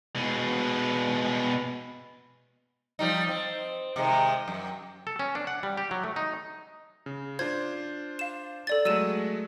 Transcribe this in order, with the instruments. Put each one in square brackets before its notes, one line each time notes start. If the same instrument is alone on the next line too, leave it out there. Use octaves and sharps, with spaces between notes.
[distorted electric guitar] B2 G#3
[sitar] F3 G3 D#4
C4
C3 D#3 G#3
F#2
[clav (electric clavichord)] A4
C#4
D4
F#5
G3
G4
F#3
A3
D#4
[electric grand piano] C#3
[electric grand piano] D4 F4 C5 [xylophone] G#6
[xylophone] F5 E7
A4 D5 A6
[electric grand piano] F#3 G#3 A3 [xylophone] E6 D#7 E7